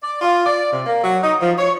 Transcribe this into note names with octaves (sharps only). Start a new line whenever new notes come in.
D5
F4
D5
C3
A#3
F#3
D#4
F3
C#5